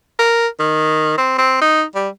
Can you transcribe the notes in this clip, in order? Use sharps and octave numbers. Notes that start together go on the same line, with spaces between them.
A#4
D#3
C4
C4
D#4
G3